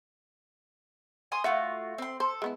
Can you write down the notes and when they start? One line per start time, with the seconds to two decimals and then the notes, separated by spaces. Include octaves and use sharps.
1.32 G#5 C6 D#6
1.44 A3 F4 F#4 E5
1.98 C4 C6
2.20 A4 C5
2.42 G#3 B3 E4